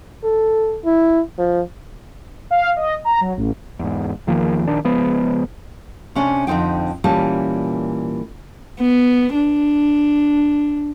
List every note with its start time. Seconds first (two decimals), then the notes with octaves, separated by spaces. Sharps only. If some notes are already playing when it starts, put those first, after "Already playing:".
0.24 A4
0.85 E4
1.38 F3
2.51 F5
2.76 D#5
3.05 A#5
3.21 F#3
3.37 A1
3.79 E2 G#2
4.27 E2 D#3 F3 A#3
4.67 A#1 D#3 D4
4.85 C#3 F3 G#3 B3
6.15 C3 C#4 D4
6.47 F2 D3 C4 D#4 G5
7.04 A#2 E3 G3 A#3 C#4 A5
8.80 B3
9.35 D4